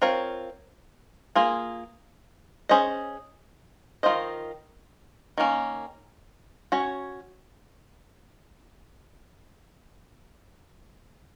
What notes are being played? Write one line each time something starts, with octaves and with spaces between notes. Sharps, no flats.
C4 F4 A#4 C#5
A#3 F4 G#4
C#4 G#4 C5 D#5
D#3 A#3 F4 C5 D#5
D#3 A#3 C#4
C#4 F#4 C#5